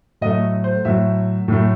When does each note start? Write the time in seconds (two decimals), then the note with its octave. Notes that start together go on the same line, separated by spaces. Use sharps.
0.21 A2 F#3 A3 D#5
0.64 C5
0.85 A2 F#3 A3 E5
1.48 A2 F#3 A3